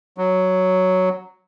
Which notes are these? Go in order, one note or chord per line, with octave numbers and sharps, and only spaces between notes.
F#3